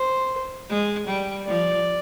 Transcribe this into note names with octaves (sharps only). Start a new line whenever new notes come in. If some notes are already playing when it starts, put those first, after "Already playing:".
Already playing: C5
G#3
G3
F3 D5